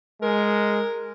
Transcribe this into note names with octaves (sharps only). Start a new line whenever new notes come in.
G#3 A#4